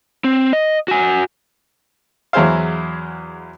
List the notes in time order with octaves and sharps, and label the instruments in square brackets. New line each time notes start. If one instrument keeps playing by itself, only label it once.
[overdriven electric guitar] C4
D#5
F#4 G#5
[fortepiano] E2 F#3 E4 G#4 C5 F5